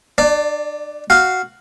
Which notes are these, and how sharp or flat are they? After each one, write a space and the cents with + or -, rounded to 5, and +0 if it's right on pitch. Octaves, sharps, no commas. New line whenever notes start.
D4 +40 D5 +0
F#4 +0 F5 +0